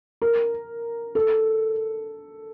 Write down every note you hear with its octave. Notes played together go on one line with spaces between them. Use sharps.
A#4
A4